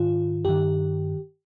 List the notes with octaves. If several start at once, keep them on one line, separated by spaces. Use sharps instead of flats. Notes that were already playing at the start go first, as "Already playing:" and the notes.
Already playing: G#2 D#3 F4
G2 D#3 G4